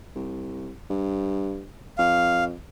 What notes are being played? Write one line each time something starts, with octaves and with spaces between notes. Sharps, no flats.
C2
G2
F2 F5